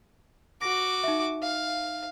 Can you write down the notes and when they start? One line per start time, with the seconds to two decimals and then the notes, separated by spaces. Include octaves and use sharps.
0.62 F#4 D6 A#6
1.04 D#4 E5
1.43 F5